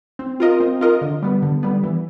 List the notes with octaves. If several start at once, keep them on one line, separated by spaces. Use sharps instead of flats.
C4
F4 A#4 D#5
C4
F4 A#4 D#5
D3
G3 B3
D3
G3 B3
E3